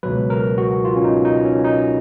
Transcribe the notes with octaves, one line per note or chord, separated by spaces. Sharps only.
C#2 B2 F#3 B4
A#4
F#4
F4
C#4
D#4
D#4
C#4
D#4